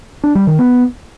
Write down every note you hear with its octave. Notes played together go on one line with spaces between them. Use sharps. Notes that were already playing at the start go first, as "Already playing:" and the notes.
D4
G3
D#3
B3